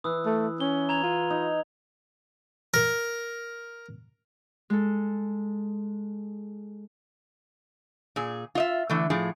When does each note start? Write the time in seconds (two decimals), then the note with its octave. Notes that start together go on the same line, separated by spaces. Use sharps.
0.04 E3 D#6 E6 F#6
0.26 A3
0.60 C#4 G7
0.89 A#5 G#6 F7
1.03 F4
1.30 D#4
2.74 A#4
4.70 G#3 A4
8.16 A#2 G#4
8.55 F4 D#5 E5
8.90 D3 E3 A3
9.10 A2 F3 G#4